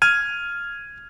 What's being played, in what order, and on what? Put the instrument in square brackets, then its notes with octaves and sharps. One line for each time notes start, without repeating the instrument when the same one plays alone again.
[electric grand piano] F6 G#6 D#7